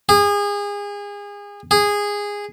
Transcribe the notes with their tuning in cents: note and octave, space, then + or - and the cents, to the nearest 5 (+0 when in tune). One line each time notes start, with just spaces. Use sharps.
G#4 -30
G#4 -15